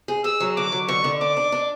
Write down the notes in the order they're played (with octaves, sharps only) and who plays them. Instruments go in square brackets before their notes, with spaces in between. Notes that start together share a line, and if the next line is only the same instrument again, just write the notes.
[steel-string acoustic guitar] G#4
[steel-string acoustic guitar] G#4 [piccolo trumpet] E6
[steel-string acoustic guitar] F#3
[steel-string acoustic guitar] D3 [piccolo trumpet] D6
[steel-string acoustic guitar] F#3
[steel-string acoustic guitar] D3 [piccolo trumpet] C#6
[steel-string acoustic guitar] D3
[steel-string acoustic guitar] D4 [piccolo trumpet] D6
[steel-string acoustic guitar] D4
D4